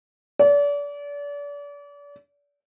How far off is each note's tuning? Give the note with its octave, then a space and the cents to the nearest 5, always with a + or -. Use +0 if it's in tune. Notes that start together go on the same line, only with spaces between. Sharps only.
D5 -35